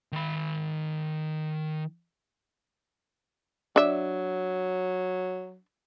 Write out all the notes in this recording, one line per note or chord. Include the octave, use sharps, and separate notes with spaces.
D#3 B5
F#3 D4 E5